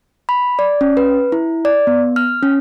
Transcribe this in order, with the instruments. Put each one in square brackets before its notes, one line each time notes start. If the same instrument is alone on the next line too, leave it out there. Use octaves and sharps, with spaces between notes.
[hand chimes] B5
D5
C#4
B4
E4
D5
B3
F6
C#4